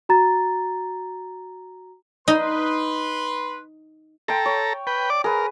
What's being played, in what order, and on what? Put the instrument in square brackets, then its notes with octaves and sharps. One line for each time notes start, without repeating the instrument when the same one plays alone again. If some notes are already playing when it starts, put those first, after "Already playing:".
[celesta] F#4 A#5 A6
[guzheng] D#4 [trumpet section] B4 C6
[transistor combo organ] A4 A#5 [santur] G5 C6
[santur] C#5
[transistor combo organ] B4 G5
D5 D6
[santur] G#4 B4 [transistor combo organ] A#4